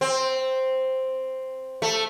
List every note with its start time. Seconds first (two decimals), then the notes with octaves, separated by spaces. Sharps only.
0.01 C4
1.82 A3